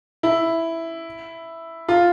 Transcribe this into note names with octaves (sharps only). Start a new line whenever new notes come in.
E4
F4